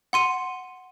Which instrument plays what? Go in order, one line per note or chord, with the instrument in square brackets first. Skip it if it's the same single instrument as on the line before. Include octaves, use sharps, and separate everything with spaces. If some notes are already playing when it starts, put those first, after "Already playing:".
[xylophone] F#5 C6 D#7